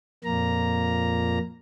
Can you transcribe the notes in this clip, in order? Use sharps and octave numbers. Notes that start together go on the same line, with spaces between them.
F2 A#2 A#3 A#5